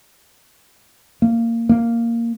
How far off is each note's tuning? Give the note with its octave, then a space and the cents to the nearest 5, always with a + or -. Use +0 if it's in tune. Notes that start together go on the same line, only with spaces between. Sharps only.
A#3 -15
A#3 -5